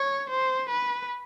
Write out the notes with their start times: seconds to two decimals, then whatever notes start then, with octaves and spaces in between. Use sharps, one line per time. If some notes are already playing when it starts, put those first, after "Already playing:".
Already playing: C#5
0.30 C5
0.70 B4